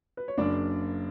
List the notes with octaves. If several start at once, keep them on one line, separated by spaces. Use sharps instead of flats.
B4
C#5
F#1 F#2 C#3 D4 D5